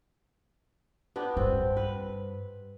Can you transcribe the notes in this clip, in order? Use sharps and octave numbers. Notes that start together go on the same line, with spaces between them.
B3 D4 G4
G2 C4 F4
B4